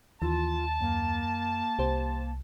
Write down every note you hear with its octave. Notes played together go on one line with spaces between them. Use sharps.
D#2 E3 F4 A5
F#2 A#3
C2 G4 C5